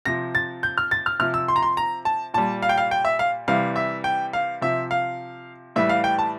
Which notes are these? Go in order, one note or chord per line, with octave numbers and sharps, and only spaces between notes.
C3 F3 A#6
A6
G6
F6
A6
F6
C3 F3 F6
E6
C6
A#5
C6
A#5
A5
A#2 G3 A5
F5
G5
F5
G5
E5
F5
C3 E3 G3 F5
E5
G5
F5
C3 F3 E5
F5
A2 E3 G3 E5
F5
G5
A5